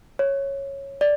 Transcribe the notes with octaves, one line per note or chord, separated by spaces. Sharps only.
C#5
D5